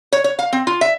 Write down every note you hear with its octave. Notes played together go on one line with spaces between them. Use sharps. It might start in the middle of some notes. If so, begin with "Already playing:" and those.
C#5
C#5
F5
C4
F4
E5